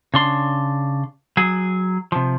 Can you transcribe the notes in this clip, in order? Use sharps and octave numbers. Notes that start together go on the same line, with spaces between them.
C#3 D4 C6
F#3 G#4
C3 F3